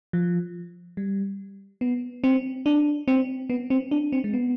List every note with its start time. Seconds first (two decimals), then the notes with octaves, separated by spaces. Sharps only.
0.13 F3
0.97 G3
1.81 B3
2.24 C4
2.66 D4
3.08 C4
3.50 B3
3.70 C4
3.91 D4
4.12 C4
4.24 G#3
4.33 B3